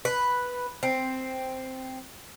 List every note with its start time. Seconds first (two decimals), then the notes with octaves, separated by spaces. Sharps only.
0.05 B4
0.83 C4